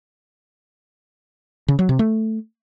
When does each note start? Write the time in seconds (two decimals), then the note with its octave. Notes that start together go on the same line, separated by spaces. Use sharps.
1.68 C#3
1.79 F#3
1.89 C3
1.99 A3